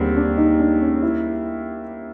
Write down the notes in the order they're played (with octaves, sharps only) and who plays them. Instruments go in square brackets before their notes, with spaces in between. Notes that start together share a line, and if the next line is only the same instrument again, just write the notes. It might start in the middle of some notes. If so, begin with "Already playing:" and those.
Already playing: [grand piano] D#2 D3 G3 C4 [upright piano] G#4
[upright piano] D4
D#4
D4
C#4
E4